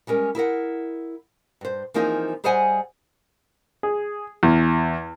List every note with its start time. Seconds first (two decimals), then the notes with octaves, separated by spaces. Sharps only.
0.07 G3 G#3 C#4 A#4
0.35 E4 G#4 A#4 F#5
1.61 G2 C5
1.94 E3 F3 A#3 C4 D#4 G#4
2.44 G3 G#4 C5 D#5 F#5 G#5
3.83 G#4
4.43 E2